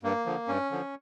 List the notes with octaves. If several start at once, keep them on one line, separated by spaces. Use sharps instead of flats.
G2 A#3
D3 F3
G2 C#4
D3 F3